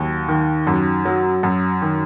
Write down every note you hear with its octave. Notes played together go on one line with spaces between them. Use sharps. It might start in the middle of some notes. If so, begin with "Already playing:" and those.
Already playing: D#2 F#3
D#3
F#2
F#3
F#2
D#3